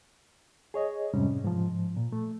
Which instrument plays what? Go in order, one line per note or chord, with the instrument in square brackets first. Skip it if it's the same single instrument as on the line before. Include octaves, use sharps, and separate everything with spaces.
[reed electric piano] G#4 C#5 D#5
F2 G#2 C3 G3 C#4
G#2 F3
A#2
A3